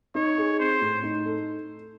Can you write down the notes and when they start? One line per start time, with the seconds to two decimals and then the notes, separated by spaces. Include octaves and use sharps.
0.15 D#4 C#5
0.38 G#4
0.59 C4 C5
0.81 A2
1.03 D#4
1.25 A4